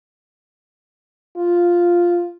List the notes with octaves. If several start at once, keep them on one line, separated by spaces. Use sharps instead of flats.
F4